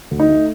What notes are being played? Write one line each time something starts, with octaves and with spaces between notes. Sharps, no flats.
D2
D#4
A3